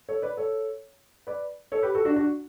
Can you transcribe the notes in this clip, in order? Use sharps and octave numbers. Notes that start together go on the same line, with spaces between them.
A4 C#5
B4 D5
A4 C#5
B4 D5
A4 C#5
G4 B4
F#4 A4
D4 F#4
D4 F#4